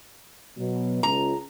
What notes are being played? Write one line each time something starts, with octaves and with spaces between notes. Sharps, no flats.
B2 F#3
C#2 A#5